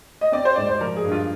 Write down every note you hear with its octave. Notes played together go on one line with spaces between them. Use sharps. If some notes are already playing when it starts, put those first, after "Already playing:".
D#5
C4 D5
C5
G#2 D5
C5
F3 A#4
G#4
G2
F4